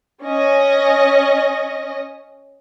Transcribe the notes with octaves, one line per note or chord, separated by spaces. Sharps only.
C#4 D#5